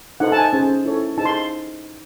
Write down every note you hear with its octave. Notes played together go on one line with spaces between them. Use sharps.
D#4 A4 C5 F#5
A5
G#5
C#4 G#4 C5
E4 A4 C#5
D#4 G#4 C5 A5
C6